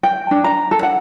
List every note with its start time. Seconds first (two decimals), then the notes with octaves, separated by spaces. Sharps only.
0.03 G5
0.31 D4
0.44 A#5
0.71 A4
0.83 F#5